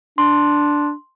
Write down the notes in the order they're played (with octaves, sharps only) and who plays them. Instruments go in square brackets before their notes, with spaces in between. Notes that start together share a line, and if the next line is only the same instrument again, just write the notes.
[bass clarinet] D4 [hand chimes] C6